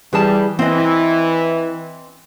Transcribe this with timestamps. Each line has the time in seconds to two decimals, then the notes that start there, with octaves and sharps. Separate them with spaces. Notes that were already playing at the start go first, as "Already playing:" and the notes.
0.13 E3 G3 G#4 A5
0.59 E3 C4 D#5